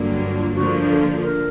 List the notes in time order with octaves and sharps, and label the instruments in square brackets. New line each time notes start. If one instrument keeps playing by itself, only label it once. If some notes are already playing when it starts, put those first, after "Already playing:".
Already playing: [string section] G2 D3 F#3 A#3
[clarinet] F4
[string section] D3 F3 A#3 [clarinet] F#4
[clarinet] A4
A#4